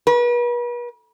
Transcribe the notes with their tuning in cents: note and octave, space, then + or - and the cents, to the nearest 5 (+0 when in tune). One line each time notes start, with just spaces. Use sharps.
B4 -40